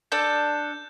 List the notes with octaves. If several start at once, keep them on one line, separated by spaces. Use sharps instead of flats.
D4 A4 G6